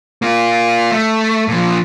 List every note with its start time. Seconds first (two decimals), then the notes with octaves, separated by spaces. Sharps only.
0.22 A#3 F4
0.92 A3
1.48 A#2 F3